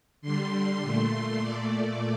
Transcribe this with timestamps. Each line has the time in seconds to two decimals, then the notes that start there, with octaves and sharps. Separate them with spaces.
0.22 D3 G3 C6
0.82 A#2 A3
1.41 A#2 A3 D5